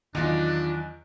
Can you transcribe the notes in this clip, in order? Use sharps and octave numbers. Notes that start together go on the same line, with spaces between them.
E2 D#3 F#3 D4 D#4 F4 D#5 D7